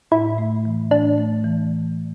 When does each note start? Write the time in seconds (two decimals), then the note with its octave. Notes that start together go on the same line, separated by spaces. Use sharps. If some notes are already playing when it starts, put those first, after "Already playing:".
0.11 A2 E4
0.38 A3
0.65 E3
0.91 A2 D4
1.18 A3
1.44 E3